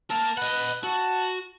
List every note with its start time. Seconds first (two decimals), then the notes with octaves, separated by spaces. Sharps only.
0.10 A#3 A#4 A5
0.37 B4 D#5 F#5
0.84 F#4 A5